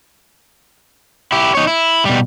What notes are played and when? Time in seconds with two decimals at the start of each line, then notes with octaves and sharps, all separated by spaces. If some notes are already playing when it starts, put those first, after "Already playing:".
1.32 E4 G4
1.55 D#4 C#5
1.67 E4
2.05 B2 G3